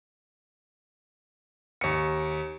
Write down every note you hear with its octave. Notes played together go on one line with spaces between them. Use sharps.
D#2 C#7